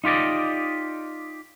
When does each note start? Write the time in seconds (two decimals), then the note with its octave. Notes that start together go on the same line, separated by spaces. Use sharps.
0.04 D#4 F4 G4 D5 D#5